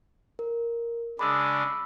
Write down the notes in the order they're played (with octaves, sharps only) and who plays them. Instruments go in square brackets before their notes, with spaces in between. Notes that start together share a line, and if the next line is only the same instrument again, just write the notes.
[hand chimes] A#4
[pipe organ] C#3 G#3 D4 [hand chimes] B5 D6 E6